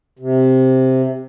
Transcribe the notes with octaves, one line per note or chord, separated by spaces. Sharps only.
C3